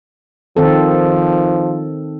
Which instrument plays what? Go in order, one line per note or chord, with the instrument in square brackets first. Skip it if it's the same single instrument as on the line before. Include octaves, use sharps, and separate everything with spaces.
[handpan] D#3 C4 A4 [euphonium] F3